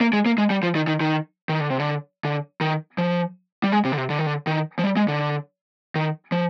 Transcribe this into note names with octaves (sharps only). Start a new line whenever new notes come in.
A#3
G#3
A#3
G#3
G3
F3
D#3
D#3
D#3
D#3
D3
C3
D3
D3
D#3
F3
G3
G#3
C3
D3
C3
D3
D#3
D3
D#3
F3
G3
G#3
D3
D#3
F3